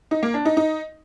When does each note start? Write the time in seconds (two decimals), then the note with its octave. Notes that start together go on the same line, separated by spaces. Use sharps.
0.11 D#4
0.23 A#3
0.34 D4
0.45 D#4
0.57 D#4